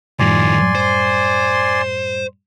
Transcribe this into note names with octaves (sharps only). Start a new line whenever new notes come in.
F#2 A2 D#3 F3 G3 D5 G#5 C6
C5